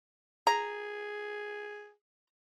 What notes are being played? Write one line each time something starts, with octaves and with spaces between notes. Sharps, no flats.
G#4 A#5